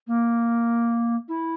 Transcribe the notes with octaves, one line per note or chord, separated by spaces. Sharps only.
A#3
E4